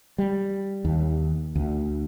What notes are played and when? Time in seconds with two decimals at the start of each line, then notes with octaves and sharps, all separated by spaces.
0.18 G3
0.85 D#2
1.55 D2